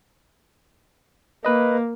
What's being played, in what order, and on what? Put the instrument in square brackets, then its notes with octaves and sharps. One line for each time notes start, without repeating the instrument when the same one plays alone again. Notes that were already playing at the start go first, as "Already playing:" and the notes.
[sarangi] A#3 [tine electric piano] B4 D#5